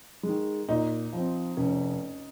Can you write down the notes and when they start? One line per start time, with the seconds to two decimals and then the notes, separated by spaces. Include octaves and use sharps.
0.23 G#3
0.29 D#3
0.69 A#2 D#4
1.13 F3 C4
1.57 F1 C#4